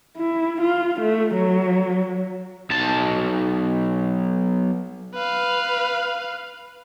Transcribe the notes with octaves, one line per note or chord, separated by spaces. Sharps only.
E4
F4
A3
F#3
B1 A5
B4 F5